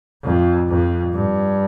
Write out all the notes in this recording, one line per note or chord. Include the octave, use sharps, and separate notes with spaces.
F2
F2
G2